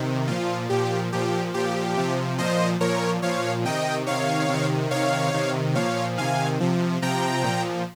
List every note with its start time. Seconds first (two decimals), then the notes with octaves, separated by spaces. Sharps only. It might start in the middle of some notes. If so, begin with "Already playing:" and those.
Already playing: C3 D#3
0.27 A#2 F3 F4
0.70 A#2 F3 G4
1.12 A#2 F3 G4
1.54 A#2 F3 G4
1.97 C3 F3
2.38 A#2 F3 C5 D#5
2.80 A#2 F3 A#4 C#5
3.22 A#2 F3 C#5 F5
3.65 C3 D#3 D#5 G5
4.07 C3 D#3 C#5 F5
4.49 C3
4.54 D#3
4.91 C3 D#3 C#5 F5
5.34 C3 D#3
5.75 A#2 F3 C#5 F5
6.17 C3 D#3 F5 G#5
6.60 C3 F3
7.02 C3 F3 G5 A#5
7.44 A#2 F3